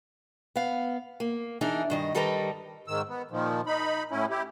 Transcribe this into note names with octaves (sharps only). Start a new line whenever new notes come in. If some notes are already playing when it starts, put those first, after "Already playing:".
B3 F5
A#3
E3 D4 D#4 G#4
G2 D#3 D#5
D#3 G3 A4 B4 D#5 A#5
G#2 D#3 E6
B3
A#2 D#3 F3
D#4 B5
A2 C#4 E4
E4 G4